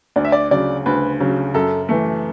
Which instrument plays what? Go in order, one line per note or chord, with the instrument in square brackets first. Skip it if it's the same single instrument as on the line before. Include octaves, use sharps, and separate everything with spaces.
[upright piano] D2 [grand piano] D5
[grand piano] E5
D5
[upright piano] C#3 F#3 [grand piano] D5
[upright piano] D2 [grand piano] B4
[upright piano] C#3 F#3
[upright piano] F#2 [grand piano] A4
[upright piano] E3 A3